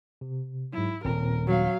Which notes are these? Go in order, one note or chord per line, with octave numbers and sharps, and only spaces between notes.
C3
G#2 F#3 E4
D#1 A#2 C4 A#4
F#3 F5